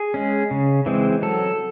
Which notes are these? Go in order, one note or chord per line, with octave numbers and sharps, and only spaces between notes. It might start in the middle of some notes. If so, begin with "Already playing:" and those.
Already playing: G#4
G#3 C#4
C#3
E3 G#3 C4
F#3 A4